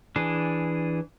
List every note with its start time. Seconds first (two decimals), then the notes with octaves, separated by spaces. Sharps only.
0.16 E3 D4 G#4